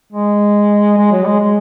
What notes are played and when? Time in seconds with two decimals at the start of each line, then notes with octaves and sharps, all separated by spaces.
0.12 G#3
0.98 G#3
1.12 F#3
1.25 G#3
1.40 G#3